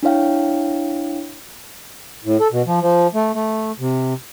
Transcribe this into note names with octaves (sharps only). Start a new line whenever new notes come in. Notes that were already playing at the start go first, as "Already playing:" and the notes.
D4 E4 C#5 F5 G5
A2
A4
B2
F3
F3
A3
A3
C3